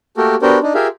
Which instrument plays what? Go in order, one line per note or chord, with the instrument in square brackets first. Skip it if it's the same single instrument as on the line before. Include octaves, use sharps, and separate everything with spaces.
[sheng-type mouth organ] A3 A#3 F#4 G4 A4 A#4
B3 D4 F#4 G4 A#4 C5
D4 D#4
F4 G4 G#4 A#4 E5 F5